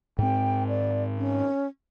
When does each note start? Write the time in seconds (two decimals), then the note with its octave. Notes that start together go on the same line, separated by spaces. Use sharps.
0.19 G#2 C4 G5
0.69 D5
1.18 C#4